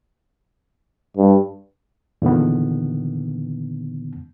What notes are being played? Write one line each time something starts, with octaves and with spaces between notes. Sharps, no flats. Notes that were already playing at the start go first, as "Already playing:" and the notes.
G2
E2 A#2 D3 D#3 B3